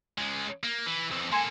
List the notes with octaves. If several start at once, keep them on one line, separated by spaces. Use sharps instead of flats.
C#2 G#3
A#3
E3
F2 E3
A#3 A4 G#5 C6